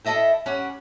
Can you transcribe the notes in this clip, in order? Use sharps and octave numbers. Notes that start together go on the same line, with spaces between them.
E4 A4 D#5 E5 G5
G3 C#4 C#5 F#5